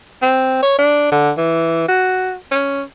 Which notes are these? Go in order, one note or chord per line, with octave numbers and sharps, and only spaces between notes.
C4
C#5
D4
D3
E3
F#4
C#4